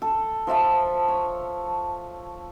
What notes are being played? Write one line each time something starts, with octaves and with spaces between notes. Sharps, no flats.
A4
F3 A4 E5 A5
C#5